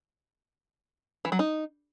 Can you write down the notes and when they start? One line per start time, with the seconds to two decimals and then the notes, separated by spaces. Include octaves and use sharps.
1.25 E3
1.32 F#3
1.39 D#4